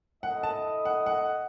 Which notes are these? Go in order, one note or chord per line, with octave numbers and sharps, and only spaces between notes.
E4 A4 D#5 F#5
A5
F#5
F#5